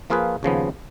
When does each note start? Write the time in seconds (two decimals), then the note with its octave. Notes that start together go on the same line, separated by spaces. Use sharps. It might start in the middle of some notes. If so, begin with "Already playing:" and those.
0.10 F3 A#3 F4 G#4 B4
0.43 D#2 C#3 F3 B3